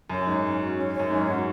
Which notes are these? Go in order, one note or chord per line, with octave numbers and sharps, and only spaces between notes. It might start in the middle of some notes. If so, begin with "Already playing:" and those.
F#2 C#4
G#2 C#5
C#4
F#4
C#4
C#5
F#2
G#2 C#4
G#2 F#4